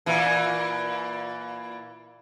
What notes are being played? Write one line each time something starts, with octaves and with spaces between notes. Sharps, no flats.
A#2 E3